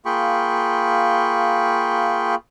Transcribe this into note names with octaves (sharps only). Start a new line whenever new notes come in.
A#3 F4 G#4 G5 B5 C#6